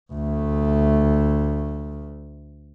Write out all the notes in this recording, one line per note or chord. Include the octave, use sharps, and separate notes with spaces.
D2 A3